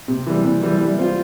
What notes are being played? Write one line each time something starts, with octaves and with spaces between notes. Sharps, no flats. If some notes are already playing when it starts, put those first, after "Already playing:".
C3
E3 G3
C3
E3 G3
G3
C4 F4